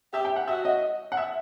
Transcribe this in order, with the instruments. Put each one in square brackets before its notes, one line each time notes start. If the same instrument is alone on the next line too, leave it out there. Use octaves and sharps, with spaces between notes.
[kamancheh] G4 [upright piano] E5
[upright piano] G5
F#5
[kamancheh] F#4 [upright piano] E5
[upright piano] D#5
F#5
E5